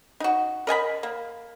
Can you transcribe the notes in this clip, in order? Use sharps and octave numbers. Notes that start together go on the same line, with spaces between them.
D#4 F#4
A#4 D#5 G#5 B5
A#3